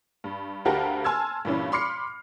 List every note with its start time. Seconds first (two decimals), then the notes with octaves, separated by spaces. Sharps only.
0.24 G2
0.65 D2 F#4 G4 A#4 F5 A5
1.04 G#5 A5 C6 E6 F6 G#6
1.45 G2 A#2 E3 C#4
1.72 B5 C6 D6 F6 C7 C#7